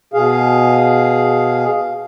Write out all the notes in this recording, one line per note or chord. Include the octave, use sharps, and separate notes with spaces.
B2 G#4 F5